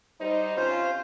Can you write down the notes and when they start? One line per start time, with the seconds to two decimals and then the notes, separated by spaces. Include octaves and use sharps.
0.20 G3 D#4 C5
0.57 C3 C#4 F4 C5